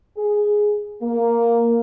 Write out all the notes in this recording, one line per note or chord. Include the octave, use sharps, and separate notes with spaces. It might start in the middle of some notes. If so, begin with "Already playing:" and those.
G#4
A#3